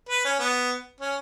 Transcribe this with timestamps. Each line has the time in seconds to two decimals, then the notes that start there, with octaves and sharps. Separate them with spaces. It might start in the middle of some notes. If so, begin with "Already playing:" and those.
0.09 B4
0.25 C#4
0.40 B3
1.00 C#4